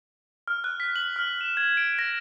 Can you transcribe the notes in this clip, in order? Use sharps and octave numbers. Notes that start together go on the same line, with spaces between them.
F6
F#6
B6
F#7
F6
E7
G#6
D7
A#6